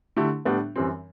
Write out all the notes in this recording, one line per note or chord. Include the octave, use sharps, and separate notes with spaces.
D3 A3 E4 G4
A2 G3 B3 D4
F#2 E3 G3 C4